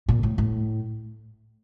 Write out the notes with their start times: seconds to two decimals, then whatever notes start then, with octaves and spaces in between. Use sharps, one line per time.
0.08 A#2
0.23 A2
0.38 A2